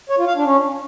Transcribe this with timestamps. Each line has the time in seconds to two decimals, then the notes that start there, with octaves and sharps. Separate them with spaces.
0.09 C#5
0.18 F4
0.27 F5
0.36 D4
0.45 C#4